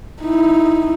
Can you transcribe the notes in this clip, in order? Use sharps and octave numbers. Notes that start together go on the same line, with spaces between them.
D#4 E4